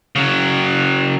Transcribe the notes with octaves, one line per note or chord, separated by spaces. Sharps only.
C#3 F#3